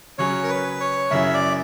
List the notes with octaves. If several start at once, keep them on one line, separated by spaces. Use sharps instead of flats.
C#3 F#3 C#4 C#5
A#4
B4
C#5
F#2 C#3 F#3 C#4 E4 E5
D5